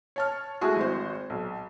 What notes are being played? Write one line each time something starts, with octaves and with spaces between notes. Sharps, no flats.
C#5 A5 F6
G#3 A3 E4 F#4 G#4
G#1 F#4 C5
B1